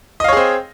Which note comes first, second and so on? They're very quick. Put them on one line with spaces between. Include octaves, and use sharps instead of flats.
D#5 F5 C#5 G#4 C4